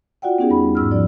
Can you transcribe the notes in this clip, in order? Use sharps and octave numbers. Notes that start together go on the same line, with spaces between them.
F4 F#4 D5 F#5 G5
B3 C#4 D#4 G4 G#4
E2 G3 B5
G#2 E6 F6
F3 D5